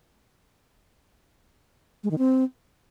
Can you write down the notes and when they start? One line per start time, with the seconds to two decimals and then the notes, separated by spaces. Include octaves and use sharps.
2.04 G#3
2.11 D#3
2.18 C4